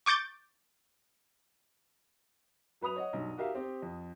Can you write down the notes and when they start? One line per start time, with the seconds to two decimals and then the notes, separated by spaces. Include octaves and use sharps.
0.06 C#6 D6 G6 A6 D7
2.81 F#3 B4 B5 D#6 F7
2.96 C#5 D#5 F#5
3.13 B1 G2
3.38 F#4 G4 A#4 E5 F5
3.55 C4 G4
3.82 F2